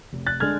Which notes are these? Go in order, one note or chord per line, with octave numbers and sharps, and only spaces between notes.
F1
F#6 A6
D3 G#3 D4 F6 G#6